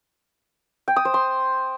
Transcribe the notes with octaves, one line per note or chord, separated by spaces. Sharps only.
G5
D#6
C5
C6